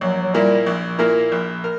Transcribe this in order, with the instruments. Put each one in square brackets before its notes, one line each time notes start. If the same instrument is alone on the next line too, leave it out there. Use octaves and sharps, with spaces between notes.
[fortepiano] A#1 [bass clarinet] F#3
[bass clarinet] F#3
[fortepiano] A#2 A#3 E4 A#4 [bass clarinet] G3
[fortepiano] A#1
A#2 A#3 E4 A#4
A#1
A#4